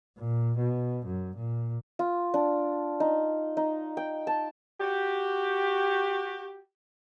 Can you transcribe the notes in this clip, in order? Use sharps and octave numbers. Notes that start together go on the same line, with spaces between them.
A#2
B2
F#2
A#2
F4
D4
D#4
D#4
G5
A5
F#4 G4